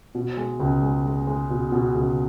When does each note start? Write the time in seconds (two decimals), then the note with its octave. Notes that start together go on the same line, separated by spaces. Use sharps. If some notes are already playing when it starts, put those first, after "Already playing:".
0.15 B2
0.37 G#3
0.60 C#2
0.82 G#3
1.06 G#3
1.27 G#3
1.50 B2
1.72 B2
1.95 C#2